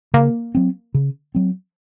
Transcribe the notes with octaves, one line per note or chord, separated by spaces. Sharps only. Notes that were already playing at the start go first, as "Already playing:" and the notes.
C#3 A#3
F#3 C4
C#3
F#3 C4